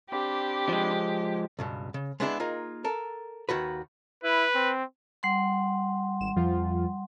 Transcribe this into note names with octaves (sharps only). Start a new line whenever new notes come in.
C4 D4 G4 B5
F3 G#3
C#2 G2 B2
C#3
G#3 B3 D4 E4 F#4 G#4
A#3 D#4 F4 G#4 A#4
A4 A#4
D#2 D#3 F#4 B4
E4 B4
C4
G3 F#5 C6
G#1 E7
F2 F3 F4